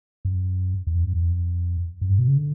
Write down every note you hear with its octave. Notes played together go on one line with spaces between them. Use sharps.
F#2
E2
F2
F#2
E2
F2
F#2
G2
B2
C#3
D3